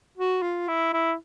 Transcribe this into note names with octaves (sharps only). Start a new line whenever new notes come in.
F#4
F4
E4
E4